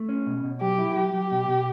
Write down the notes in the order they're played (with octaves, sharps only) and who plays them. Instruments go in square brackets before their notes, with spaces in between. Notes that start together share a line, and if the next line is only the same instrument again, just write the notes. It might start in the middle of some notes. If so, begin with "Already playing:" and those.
Already playing: [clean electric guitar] A3
C#4
B2
B2
[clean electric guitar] F#3 [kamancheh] G4
[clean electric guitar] E4
[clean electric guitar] F#3 [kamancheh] G4
[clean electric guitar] F#3
B2
B2